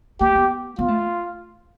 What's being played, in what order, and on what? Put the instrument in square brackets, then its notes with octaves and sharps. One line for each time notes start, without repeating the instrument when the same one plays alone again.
[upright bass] A#3 [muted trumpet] G4
[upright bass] B3
[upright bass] B3 [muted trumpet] F4
[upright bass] A3